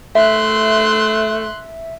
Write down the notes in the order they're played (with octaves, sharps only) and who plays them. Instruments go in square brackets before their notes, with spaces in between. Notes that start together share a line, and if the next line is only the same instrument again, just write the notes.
[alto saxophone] A3 [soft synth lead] E5 [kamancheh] C6 F#6